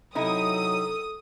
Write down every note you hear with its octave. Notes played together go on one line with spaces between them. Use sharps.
C3 F#3 D#4 E4 A4 D#6